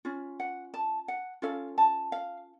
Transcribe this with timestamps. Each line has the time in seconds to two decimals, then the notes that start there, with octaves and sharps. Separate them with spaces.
0.05 C#4 F4
0.40 F#5
0.74 A5
1.08 F#5
1.42 C#4 F4 A4 F5
1.78 A5
2.12 F5